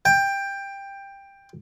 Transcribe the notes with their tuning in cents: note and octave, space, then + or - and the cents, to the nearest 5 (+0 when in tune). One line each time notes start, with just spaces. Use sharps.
G5 +15